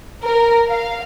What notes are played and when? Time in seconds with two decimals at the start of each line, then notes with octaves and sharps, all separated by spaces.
0.22 A#4
0.70 F5